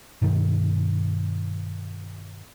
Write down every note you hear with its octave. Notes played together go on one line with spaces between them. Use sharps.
G2 B2 D#3